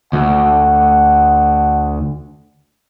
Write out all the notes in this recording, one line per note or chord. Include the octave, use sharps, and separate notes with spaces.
D2 F#5